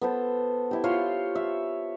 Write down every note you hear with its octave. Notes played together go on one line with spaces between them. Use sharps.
B3 A4 C5
E4 G4
F4 C#5 E5 C6
E5